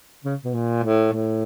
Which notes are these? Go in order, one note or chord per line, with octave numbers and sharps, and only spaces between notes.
C#3
B2
A#2
A2
A2